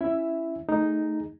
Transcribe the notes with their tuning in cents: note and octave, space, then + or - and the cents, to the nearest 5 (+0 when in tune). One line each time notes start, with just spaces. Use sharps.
C#4 +0 E4 +10 E5 +0
A3 +5 D#4 +0 G#4 +0